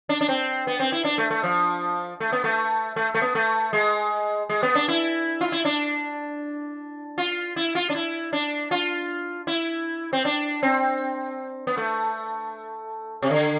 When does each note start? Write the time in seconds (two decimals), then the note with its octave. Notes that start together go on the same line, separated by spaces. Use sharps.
0.09 D4
0.21 D4
0.29 C4
0.67 B3
0.80 C4
0.92 E4
1.04 D4
1.18 A3
1.30 A3
1.43 F3
2.20 A3
2.32 B3
2.44 A3
2.96 A3
3.15 A3
3.22 B3
3.35 A3
3.73 G#3
4.49 G#3
4.63 B3
4.75 D4
4.88 E4
5.41 F4
5.52 E4
5.65 D4
7.18 F4
7.56 E4
7.75 F4
7.90 D4
7.95 E4
8.33 D4
8.71 F4
9.47 E4
10.13 C4
10.25 D4
10.63 C4
11.67 B3
11.77 A3
13.22 C3
13.30 D3